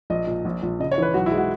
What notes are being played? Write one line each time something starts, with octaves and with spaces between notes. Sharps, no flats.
A#1 D#5
A#2
A#1
A#1
C#3 D#5
C#5
E3 B4
B1 F#4
E4
G#3
F#4